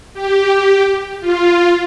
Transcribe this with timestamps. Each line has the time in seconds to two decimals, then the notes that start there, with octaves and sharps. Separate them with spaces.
0.14 G4
1.20 F4